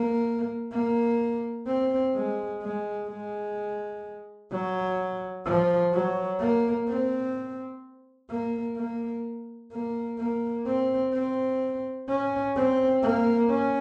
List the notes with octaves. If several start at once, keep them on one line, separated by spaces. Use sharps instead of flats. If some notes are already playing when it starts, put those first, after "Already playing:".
Already playing: A#3
A#3
C4
G#3
G#3
G#3
F#3
F3
F#3
A#3
C4
A#3
A#3
A#3
A#3
C4
C4
C#4
C4
A#3
C#4